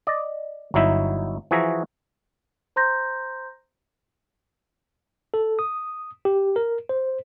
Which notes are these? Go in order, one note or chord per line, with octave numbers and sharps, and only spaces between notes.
D5 D#5
G1 F#3 D#4 E4 E5
E3 F3 F#4 G#4 E5 A#5
C5 A#5 C6 G6 A#6
A4
D#6
G4
A#4
C5